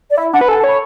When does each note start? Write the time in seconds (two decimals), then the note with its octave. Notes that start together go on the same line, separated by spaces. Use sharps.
0.10 D5
0.17 E4 E5
0.33 D4 F#5
0.41 B4
0.48 A4 G#5
0.58 A5
0.64 C#5 B5